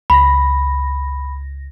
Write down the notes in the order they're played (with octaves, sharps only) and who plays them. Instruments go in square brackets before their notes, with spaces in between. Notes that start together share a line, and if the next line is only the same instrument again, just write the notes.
[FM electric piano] C#2 A#6 [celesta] B5